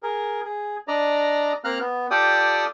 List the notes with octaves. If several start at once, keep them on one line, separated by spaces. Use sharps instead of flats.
G#4 A#4
G#4
D4 D5 D#5 A#5
A#3 C4 F5 A#5 F6 F#6
B3
F4 G4 A4 D5 G5 D#6